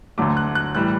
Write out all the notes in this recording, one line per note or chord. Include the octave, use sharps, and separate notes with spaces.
D2 D3 F#3 A3 D6
F#6
F#6
A2 E3 G3 F#6